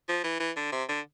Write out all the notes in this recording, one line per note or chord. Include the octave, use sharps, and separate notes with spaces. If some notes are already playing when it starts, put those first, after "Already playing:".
F3
E3
E3
D3
C3
D3